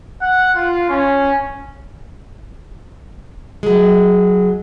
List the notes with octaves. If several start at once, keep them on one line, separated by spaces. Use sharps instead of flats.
F#5
F4
C#4
F#3 G#3